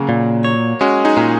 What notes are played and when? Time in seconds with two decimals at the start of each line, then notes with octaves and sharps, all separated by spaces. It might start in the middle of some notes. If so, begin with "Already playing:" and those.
Already playing: C#3 F#3 A#3
0.09 A#2
0.44 C#5
0.81 G#3 C#4 F#4
1.05 D#4 G#4
1.17 A#2